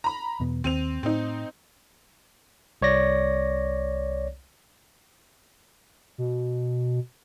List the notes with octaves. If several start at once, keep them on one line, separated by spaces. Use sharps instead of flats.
A#5 B5
E2 B2 B3
D#2 C4 D#7 F7
A2 C4 D#4
C2 C#5 D5 A#6
B2